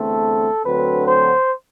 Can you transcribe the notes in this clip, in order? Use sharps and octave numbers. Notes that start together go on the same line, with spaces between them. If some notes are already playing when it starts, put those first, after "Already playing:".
Already playing: E2 D3 A3 C4 A4
D2 D3 F#3 C4 B4
C5